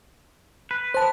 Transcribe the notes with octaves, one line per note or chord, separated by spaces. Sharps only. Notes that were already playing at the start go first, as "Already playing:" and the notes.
B4
C5 A5